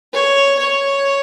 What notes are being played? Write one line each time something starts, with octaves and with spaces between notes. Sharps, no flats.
C#5
C#5